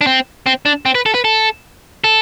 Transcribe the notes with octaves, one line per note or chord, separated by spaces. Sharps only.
D4
C4
C4
D4
C4
B4
A4
B4
A4
A4